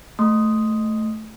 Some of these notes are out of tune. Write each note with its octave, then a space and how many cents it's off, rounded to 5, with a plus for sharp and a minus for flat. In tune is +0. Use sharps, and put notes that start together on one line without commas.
A3 -5 C6 +0 D#6 +0